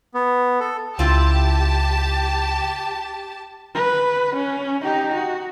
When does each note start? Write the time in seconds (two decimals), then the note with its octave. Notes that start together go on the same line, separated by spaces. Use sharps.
0.14 B3
0.60 A4
0.99 C#2 C4 E4 F4 G4 A5
3.75 B4
4.36 C#4
4.83 D#4 G4
5.14 F#4